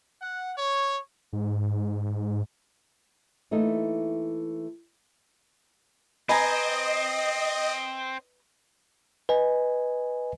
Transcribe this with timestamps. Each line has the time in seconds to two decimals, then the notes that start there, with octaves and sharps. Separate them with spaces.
0.22 F#5
0.58 C#5
1.33 G#2
3.51 E3 A3 A#3 D#4
6.29 C4 B4 D#5 G#5 A#5
9.29 B4 D#5 G#5